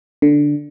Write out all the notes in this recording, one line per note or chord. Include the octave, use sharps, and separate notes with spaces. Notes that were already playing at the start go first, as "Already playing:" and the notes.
D3